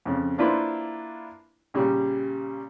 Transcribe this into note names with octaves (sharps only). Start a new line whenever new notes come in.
F2 C#3
A#3 D4 E4 F4 B4 C5
A#2 C#3 G3